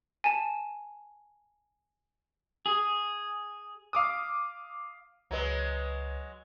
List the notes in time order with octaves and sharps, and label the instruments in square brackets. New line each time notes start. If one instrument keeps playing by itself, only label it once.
[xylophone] G#5 A5
[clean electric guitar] G#4
[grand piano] F5 D6 D#6
[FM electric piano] C#2 B4 [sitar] F#3 G#3